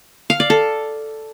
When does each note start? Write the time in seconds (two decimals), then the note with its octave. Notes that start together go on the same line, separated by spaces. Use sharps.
0.30 F5
0.40 D5
0.50 A4